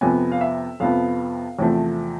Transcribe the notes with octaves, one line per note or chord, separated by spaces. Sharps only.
F2 C3 F3 B3 G#5
F5
E5
F2 C3 F3 B3 F5
E2 C3 F3 A3